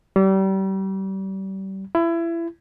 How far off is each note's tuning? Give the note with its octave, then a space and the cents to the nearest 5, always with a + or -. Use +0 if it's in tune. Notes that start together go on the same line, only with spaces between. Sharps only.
G3 -30
E4 +25